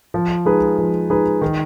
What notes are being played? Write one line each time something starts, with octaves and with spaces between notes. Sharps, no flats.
F3
G#3 D#4 G#4 B4
F3
G#3 D#4 G#4 B4
D#3